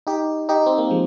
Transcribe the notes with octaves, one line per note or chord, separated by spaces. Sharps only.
D#4 G4
D#4 G4
C4
A#3
F3 G#3